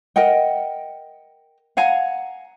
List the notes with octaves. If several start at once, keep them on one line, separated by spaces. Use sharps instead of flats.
A#4 D#5 F#5 G5
F5 F#5 G#5 A#5